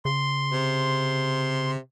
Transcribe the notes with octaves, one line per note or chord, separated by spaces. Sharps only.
C#3 C6
C3